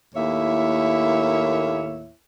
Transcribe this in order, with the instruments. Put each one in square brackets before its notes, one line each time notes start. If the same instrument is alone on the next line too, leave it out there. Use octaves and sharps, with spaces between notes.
[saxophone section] D#2 A2 A#3 E4 C#5 E5